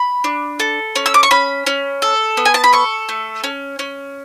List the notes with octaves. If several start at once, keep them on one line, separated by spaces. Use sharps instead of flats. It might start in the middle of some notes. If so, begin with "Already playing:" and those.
Already playing: B5
D4
A4
C#4
E6
D6
C#6
C#4 B5
C#4
A4
B3
G#5
A5
B5
A4 C#6
A3
C#4
C#4